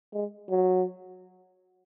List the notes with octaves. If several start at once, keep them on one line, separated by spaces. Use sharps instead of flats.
G#3
F#3